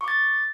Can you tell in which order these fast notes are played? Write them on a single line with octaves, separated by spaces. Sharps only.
C#6 D6 A6